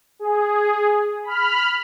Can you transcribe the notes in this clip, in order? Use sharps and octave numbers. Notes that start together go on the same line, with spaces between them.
G#4
B5 F6